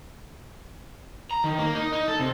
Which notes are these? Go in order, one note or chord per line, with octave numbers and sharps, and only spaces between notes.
A#5
D#3
A#3
D#4
D#4
A4
C3